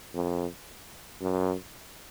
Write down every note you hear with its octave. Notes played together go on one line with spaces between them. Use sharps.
F2
F#2